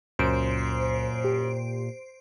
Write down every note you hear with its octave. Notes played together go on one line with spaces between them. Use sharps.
C#2 F#2 A#2 C5 D7
G4